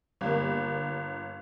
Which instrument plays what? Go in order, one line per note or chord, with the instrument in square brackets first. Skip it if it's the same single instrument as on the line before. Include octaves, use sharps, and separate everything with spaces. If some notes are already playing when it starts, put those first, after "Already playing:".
[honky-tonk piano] G1 [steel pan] G3 A#3